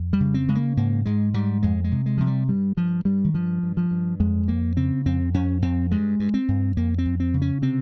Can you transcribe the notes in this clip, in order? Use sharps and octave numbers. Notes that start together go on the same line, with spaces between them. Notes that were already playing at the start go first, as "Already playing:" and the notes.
Already playing: F2
G3
C#3
C4
C#3 G#3
A#3
G#2 A#3
G#2 G#3
G#2 G3
F2 G#3
G#3
C3
G#3
C3 F3
G3
G2 G3
G2 F3
G2 G3
D#3
G2 F3
G2
F3
G2
F2 G#3
F2 A#3
C#3 C4
F2 C4
F2 C#4
F2 C4
G2 G#3
G2
C4
G2
F2 A#3
C4
F2
C4
C#3
C#4
C3 C4